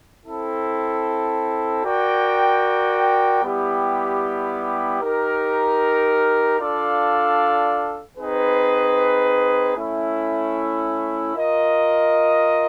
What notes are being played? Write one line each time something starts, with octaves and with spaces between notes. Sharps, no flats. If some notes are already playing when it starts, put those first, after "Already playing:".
C4 E4 A4
F#4 A#4 D5 G5
G3 B3 E4 G4
D#4 G4 A#4
D4 F4 A4 D5 F5
C4 D#4 G#4 B4
A3 C#4 E4
F4 A#4 D#5